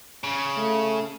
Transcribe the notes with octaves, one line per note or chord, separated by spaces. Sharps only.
C#3
A3